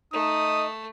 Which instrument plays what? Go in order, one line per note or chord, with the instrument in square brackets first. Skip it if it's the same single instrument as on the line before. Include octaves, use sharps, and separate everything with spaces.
[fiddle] A3 [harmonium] D#4 [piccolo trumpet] D#6